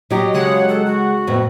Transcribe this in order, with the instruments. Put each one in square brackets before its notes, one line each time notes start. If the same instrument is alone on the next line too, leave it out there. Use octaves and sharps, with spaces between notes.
[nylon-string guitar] F#3 G4 [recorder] D#5
[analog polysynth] C#3 G#3 F#5 [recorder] C#5
[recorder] A4
F#4
[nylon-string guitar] F2 A2 B3